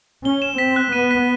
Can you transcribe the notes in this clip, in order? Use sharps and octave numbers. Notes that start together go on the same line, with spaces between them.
C#4 G7
E7
C4 B6
F#6
B3 D#7
B6